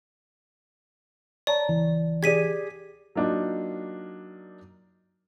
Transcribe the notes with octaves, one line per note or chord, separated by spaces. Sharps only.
C#5 D5 A5 A#5
C#2 E3
G4 G#4 D5 G#6 B6 D#7
F#3 A#3 D4 D#4 F4